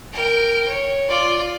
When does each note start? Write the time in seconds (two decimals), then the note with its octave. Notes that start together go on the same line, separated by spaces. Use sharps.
0.12 A#4 G5
0.68 C#5
1.08 F4 D5